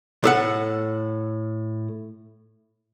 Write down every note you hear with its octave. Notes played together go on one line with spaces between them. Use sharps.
A2 A4 F#5